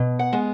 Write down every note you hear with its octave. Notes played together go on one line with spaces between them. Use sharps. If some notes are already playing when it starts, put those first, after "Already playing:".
Already playing: B2
F#5
G#3 B3